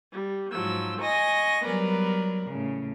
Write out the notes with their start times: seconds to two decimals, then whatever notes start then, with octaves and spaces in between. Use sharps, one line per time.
0.12 G3
0.51 G#2 F3 F#3 E6
0.99 D#5 G#5 C#6 A#6
1.63 F#3 G3 B3 A#4 B4 D5
2.47 A2 C#3